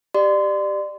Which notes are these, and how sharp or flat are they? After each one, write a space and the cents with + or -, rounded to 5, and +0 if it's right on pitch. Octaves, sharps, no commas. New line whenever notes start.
G4 +0 D5 +25 C6 -25